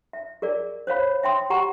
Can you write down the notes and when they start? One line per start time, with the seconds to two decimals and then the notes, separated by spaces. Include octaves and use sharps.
0.13 E5
0.42 G#4 A#4 D5
0.87 C5 C#5 F5 B5
1.23 E5 G5 C6 D#6
1.50 G4 F#5 A#5 C#6